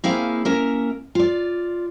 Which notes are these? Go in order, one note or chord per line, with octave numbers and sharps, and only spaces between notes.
A#3 C4 E4 G#4 F5
A#3 C#4 A#4 E5
F4 D5